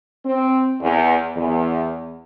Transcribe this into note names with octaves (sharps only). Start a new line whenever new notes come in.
C4
E2
E2